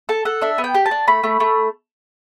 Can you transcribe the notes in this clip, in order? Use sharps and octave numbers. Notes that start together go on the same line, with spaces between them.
A4 A5
A4 F#5
D4 E5
B3
G5
G4
A5
D4
A3 B5
A3
A3